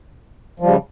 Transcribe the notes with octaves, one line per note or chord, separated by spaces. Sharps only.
C#3 F3 G3